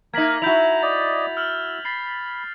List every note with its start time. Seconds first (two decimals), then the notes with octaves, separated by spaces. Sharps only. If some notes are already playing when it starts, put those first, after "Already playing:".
0.14 A#3 D#4 A#5 G#6 B6 F#7
0.42 E4 F#4 G6 B6 F7
0.83 D5 D#5 A6
1.37 E6 F6 F#7
1.85 B5 A6 C7